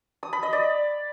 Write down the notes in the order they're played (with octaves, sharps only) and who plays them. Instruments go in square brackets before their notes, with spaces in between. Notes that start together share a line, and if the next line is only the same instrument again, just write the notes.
[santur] D#6
B5
D#5
D5